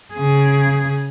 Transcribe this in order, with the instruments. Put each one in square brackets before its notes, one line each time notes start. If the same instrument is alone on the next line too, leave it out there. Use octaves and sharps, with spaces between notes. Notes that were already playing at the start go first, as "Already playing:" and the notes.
[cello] C#3 G#4